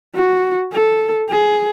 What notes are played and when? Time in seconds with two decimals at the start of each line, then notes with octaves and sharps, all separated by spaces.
0.15 F#4
0.73 A4
1.30 G#4